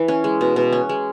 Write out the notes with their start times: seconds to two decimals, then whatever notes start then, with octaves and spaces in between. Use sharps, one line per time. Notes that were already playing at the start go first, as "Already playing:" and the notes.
Already playing: E3
0.08 C#4
0.24 G#3
0.41 B2
0.56 B2
0.72 C#4
0.89 G#3